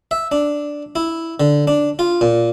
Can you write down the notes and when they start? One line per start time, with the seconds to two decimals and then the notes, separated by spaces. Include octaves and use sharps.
0.11 E5
0.32 D4
0.96 E4
1.40 D3
1.67 D4
1.99 F4
2.21 A#2